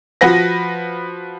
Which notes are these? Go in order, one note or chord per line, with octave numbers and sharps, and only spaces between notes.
F3 F#4 B4 A#6